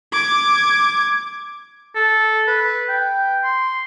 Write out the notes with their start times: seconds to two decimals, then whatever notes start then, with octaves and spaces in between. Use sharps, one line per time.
0.13 D6 G#6
1.95 A4
2.48 B4
2.89 G5
3.44 C6